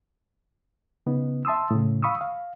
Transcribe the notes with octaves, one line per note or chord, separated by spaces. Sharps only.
C#3 B3 D#4
E5 A5 C6 D#6 E6
A2 C#3
F5 B5 C#6 D#6 E6
F5